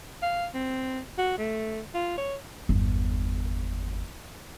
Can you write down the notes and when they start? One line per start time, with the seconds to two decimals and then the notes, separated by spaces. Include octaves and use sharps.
0.22 F5
0.54 C4
1.18 F#4
1.38 A3
1.94 F4
2.18 C#5
2.69 G1 E2